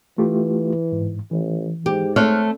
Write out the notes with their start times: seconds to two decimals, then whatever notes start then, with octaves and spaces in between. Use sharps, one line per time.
0.18 E3 A3 F4 G4
0.92 G#2
1.31 A1 E3
1.86 G#2 G4
2.16 A3 C4 C#5 F6 F#6